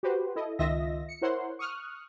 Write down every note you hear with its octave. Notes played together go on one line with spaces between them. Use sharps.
F#4 G4 B4 C5
E4 A4 D#5
C#2 D#3 F4 D#5 E5 A#6
C#7
E4 A#4 C5 C#5 F#5 C6
C#6 D#6 F6 F#6